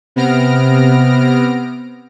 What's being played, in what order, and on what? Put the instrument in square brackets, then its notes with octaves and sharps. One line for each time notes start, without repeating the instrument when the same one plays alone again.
[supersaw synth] C3 B3 F6 A#6 D7